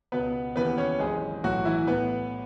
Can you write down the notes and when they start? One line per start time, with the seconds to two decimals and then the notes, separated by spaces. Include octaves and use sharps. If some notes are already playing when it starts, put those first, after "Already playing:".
0.12 C#2 B2 B3 B4
0.56 D#2 C#3 E3 B3 B4
0.78 C#4 C#5
0.99 G#1 F#2 E3 G#3 G#4
1.43 B1 A2 E3 F#3 F#4
1.65 E3 E4
1.87 A1 A2 E3 B3 B4